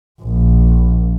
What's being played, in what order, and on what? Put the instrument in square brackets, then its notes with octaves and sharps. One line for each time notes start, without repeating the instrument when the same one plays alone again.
[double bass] A#1